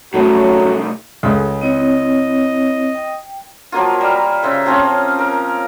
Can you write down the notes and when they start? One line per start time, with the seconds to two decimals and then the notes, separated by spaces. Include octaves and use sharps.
0.14 C2 A2 F#3 A3 C#4 F#4
1.23 C#2 G#3 G#4 A4
1.61 C4 E4 C#5 D#5
2.95 G5
3.72 F3 F#3 A#3 F4
4.01 G3
4.42 C#3 C5 E5
4.66 F3 C4 C#4 F4
5.19 A#4